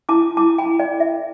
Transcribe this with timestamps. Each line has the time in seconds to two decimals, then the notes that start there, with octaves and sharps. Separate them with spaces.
0.09 E4 A5 D6
0.37 E4 A5 D6
0.58 G5 B5
0.66 E4
0.79 D5 G5
0.94 A4
1.00 E5